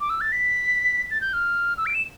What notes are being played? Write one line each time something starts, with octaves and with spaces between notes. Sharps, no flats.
D6
E6
A6
B6
A6
G6
F6
E6
D7
E7